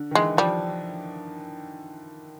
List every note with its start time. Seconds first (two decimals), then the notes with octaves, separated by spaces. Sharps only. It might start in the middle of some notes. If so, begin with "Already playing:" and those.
Already playing: D3
0.11 D#3
0.15 E3 G#3
0.37 F3 G3